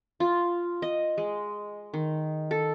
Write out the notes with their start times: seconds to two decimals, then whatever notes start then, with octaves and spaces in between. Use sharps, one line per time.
0.20 F4
0.82 D#5
1.18 G#3
1.94 D#3
2.51 A4